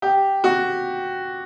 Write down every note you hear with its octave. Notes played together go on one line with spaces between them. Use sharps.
G4
F#4